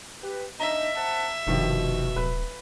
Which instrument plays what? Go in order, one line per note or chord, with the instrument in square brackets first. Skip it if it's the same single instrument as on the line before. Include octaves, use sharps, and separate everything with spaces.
[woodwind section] G4 B4
[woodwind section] D4 D#4 D#5 [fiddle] E5 [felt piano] A#5
[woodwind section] C4 F#5 A5
[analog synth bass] F1 [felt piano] G2 D#3 F3 [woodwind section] B2
[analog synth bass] D1 [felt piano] B4